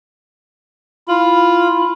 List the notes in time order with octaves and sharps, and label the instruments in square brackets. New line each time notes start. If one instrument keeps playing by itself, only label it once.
[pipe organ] E4 B5 [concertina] F4